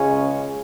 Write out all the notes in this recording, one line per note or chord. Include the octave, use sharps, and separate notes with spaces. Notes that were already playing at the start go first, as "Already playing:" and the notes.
Already playing: C#2 C#3 G#3 C#4